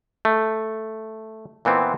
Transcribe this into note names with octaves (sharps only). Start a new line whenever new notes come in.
A3
A#2 E3 B3 C4